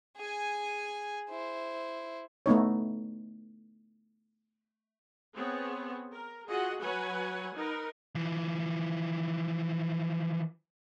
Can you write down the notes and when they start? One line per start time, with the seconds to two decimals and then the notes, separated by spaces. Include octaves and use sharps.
0.17 G#4 G#5
1.29 E4 C5
2.46 A3 B3 D#4 C#5
5.35 B3 C4 G#4 C#5
6.12 A#4
6.49 F4 F#4 G#4 D#5 F#5
6.82 F#3 B4 C#5 F#5 G#5
7.55 D#4 A#4 B4
8.15 E3 F3